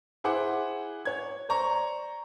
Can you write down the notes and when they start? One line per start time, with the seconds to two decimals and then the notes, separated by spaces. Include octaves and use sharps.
0.24 E4 G#4 C5 F#5 D6
1.05 C#5 G#6
1.49 C5 D5 A#5 C#6